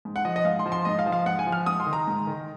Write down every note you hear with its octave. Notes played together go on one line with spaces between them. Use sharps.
G#2
F#5
F3 D#5
D#5
G#2 F5
C6
F3
C6
G#2 D#5
F5
F3
F5
G#2 F#5
G#5
F3
F6
G#2 D#6
C6
D#3
A#5
G#2
D#3